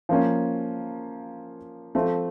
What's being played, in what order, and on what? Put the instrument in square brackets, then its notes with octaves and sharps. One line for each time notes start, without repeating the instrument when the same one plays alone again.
[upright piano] F3 A#3 C#4
F3 A3 C4